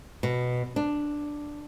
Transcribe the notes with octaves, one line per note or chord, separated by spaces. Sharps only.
B2
D4